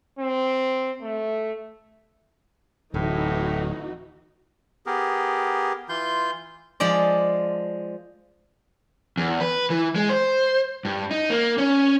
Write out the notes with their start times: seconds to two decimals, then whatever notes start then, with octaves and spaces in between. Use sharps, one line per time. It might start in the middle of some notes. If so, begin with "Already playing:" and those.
0.19 C4
1.02 A3
2.94 D1 A2 E3 D#4 F#4
4.86 B3 G4 G#4 A#4
5.89 E3 F4 C6 G6
6.80 F3 G#3 D5
9.17 E2
9.41 B4
9.70 E3
9.95 G#3
10.10 C5
10.85 G2
11.11 D#4
11.30 A#3
11.58 C#4